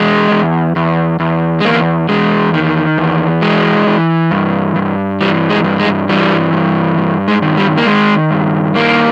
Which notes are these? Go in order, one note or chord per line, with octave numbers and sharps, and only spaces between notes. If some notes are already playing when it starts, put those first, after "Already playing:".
Already playing: E2 G#3
E2
E2
E2
G#3
E2 A#3
E2 G#3
D#3
E2
E3 G#3
E3
G2
G2
E3 G3
G#3
G2
G#3
E3 G3
G2
G2
G#3
D#3
G3
A#3
D#3 G#3
G2
D#3 A#3